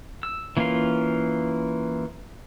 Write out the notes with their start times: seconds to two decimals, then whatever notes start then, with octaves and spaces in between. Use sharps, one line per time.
0.23 E6
0.57 E3 A#3 C#4 F4 F5